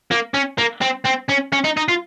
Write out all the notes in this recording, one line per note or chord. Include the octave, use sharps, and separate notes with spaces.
A#3
C#4
A#3
C4
C4
C#4
C#4
D#4
D#4
F4